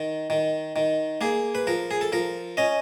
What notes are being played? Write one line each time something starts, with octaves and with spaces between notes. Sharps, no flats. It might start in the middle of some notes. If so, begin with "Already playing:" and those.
Already playing: D#3
D#3
D#3
A#3 G#4
B4
F3 A#4
G#4
A4
F3 A#4
C#4 D#5